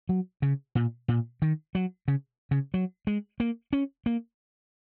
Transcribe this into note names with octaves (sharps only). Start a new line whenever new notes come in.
F#3
C#3
A#2
A#2
D#3
F#3
C#3
C#3
F#3
G#3
A#3
C#4
A#3